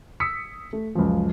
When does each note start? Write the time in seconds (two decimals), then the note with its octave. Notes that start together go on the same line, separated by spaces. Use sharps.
0.20 D#6 E6 B6 C#7
0.73 A3
0.95 C#2 F#2 F3